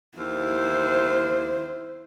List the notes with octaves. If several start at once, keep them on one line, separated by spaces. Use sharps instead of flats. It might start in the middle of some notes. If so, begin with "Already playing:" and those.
D#2 E4 C5